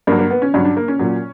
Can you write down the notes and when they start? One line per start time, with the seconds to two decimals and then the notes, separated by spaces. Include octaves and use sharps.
0.07 G2 A#3
0.12 F#3
0.19 A#3
0.31 B3
0.42 C#4
0.54 G2 F#3 C#4
0.65 D4
0.77 A#3
0.88 C#4
0.99 A#2 F#3